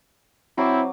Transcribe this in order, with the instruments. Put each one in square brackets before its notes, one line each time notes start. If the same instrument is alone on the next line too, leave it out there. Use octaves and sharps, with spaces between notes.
[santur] F#3 D6 [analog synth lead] C4 [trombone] E4